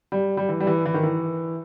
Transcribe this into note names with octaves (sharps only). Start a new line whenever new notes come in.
G3
G3
E3
G3
E3
E3
D#3
E3